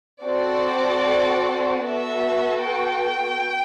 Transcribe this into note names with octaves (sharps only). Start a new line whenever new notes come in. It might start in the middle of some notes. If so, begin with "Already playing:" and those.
C4 F#4 A4 D5
B3 F#4 A4 E5
G5